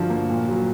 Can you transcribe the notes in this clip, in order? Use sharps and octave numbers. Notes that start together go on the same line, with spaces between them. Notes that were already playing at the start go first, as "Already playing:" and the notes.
Already playing: G2 D3 F3 F#4
A#3
A#2
F#3